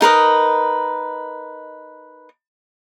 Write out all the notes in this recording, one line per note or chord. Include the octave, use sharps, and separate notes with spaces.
D#4 A#4 B4 D#5